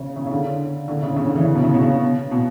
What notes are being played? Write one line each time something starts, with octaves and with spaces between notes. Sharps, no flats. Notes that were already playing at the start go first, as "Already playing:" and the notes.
Already playing: C#3
C#3
C#3
D3
D3
C#3
C#3
D3
E3
C#3
B2
C#3
B2
C#3
B2